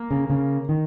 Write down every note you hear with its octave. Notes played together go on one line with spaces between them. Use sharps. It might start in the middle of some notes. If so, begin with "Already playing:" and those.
Already playing: A#3
C#3
C#3
D#3